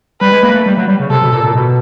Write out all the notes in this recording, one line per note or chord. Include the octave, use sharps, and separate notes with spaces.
G3 B4
G#3
A#3
A3
G3
F#3
G3
C#3
C3 A4
B2
A#2
A#2
B2